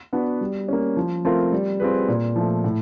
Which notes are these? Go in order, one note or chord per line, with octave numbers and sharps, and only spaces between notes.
B3 D4 F#4 B4
G3
A#3 C#4
F3
A3 C4 F4 A#4
G3
C4 F4 G#4 B4
A#2
F3 A3
A2